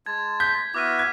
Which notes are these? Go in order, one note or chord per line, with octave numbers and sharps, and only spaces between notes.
G#3 A5 G#6
G6 B6
B3 E4 F#4 D6 F6 D#7
G#6